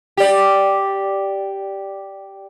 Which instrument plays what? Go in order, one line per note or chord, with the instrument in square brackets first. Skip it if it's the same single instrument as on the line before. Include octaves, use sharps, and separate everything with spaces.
[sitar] G4 D5